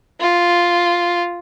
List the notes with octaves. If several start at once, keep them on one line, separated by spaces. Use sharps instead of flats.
F4